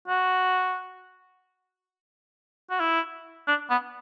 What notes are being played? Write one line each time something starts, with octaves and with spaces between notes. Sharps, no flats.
F#4
F#4
E4
D4
B3